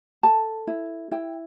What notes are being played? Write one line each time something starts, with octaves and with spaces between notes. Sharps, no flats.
A4 A5
E4
E4 G5